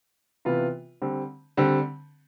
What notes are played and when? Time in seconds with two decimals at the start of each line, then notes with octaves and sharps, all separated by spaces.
0.45 C3 E3 B3 F4 B4
1.02 D3 G3 C4
1.57 D3 G3 C4